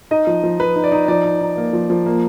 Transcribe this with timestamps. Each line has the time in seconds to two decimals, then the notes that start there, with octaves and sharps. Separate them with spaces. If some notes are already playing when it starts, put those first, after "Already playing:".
0.11 D#4 D#5
0.27 F3
0.43 F3
0.59 F3 B4
0.76 D#4
0.84 D5
0.92 D#4
1.08 F3 D5
1.25 D#4
1.41 D#4
1.57 A#3
1.73 F3
1.90 F3
2.06 A#3